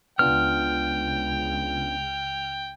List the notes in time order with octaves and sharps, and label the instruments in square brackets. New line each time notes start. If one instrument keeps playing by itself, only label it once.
[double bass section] C#2 C#3 [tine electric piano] B3 D4 F4 [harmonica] G5 [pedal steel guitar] F6